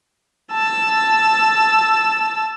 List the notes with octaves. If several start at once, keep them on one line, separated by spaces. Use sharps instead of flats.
A5 E6